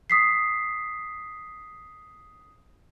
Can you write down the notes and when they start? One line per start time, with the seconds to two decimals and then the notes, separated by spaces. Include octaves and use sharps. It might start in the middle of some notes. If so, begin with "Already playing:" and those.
0.10 D#6 B6 C7